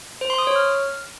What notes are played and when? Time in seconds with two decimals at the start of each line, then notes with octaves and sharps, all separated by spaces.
0.21 C5
0.30 C6
0.38 D#6
0.47 C#5
0.56 F6